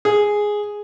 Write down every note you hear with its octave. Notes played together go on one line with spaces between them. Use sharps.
G#4